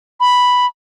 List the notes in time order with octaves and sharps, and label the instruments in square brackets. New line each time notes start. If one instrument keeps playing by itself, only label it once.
[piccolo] B5